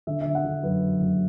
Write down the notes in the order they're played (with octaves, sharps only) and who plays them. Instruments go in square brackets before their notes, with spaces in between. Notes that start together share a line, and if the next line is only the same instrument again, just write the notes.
[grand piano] D3 E5
D3 E5
F#5
D3
F#2 B4
F#2
F#1